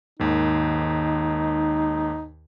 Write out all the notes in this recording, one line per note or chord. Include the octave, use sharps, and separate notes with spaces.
D#2 G#2 D#3 D#4